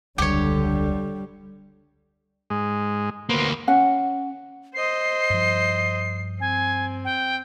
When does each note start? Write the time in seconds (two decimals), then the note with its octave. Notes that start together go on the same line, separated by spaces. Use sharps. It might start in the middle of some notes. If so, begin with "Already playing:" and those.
0.18 E1 C#2 D3 G3 G4 C#5
2.50 G#2 G#3 D#5
3.29 D2 A#3 B3 C5
3.67 C#4 F#5
4.74 C5 D#5 C7
5.30 G2 F3
6.40 C4 G#5
7.05 G5